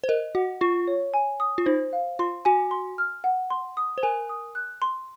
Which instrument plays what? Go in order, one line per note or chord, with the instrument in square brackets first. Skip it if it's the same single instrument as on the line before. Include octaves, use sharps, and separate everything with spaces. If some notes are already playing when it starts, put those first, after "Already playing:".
[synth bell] C5
[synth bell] A#4 [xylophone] D#5
[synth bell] F#4 [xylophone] F#5
[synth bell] F4 [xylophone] C#6
[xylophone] C#5
G#5
D#6
[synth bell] F4
[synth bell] D#4 [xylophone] C5
[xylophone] F5
[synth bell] F4 [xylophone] C6
[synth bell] F#4 [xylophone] G#5
[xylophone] C6
F6
F#5
C6
D#6
[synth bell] C5
[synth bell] A#4 [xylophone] G#5
[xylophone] D#6
F#6
C6